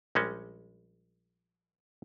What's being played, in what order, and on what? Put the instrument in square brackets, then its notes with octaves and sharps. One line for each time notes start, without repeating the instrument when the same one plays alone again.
[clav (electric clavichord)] A#1 G3 G#3 C#4